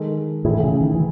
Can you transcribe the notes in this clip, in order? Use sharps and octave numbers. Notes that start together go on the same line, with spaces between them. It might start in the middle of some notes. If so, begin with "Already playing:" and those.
Already playing: D#3 G#3 D#4 A4
A2 E3 A3 E4 G#4
C#3
D#3
E3